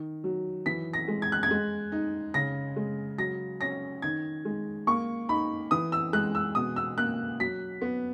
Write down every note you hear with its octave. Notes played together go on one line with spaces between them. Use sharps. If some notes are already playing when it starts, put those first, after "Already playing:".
Already playing: D#3
F#3
E3 B6
A#6
G#3
G#6
F#6
G#6
G#3
D#4
C#3 A#6
G#3
F#3 A#6
C#4 A#6
D#3 G#6
G#3
A#3 C#6
D#4 B5
E3 D#6
E6
G#3 F#6
E6
B2 D#6
E6
A#3 F#6
F#3 B6
B3